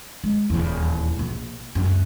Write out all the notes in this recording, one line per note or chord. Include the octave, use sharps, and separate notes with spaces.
G#3
D#1 E2
A#1
C#2 F#2